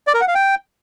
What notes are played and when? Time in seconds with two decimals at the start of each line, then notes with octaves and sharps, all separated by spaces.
0.07 D5
0.14 A#4
0.21 F#5
0.28 F5
0.35 G5